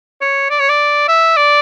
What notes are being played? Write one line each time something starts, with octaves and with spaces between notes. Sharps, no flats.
C#5
D5
C#5
D5
E5
D5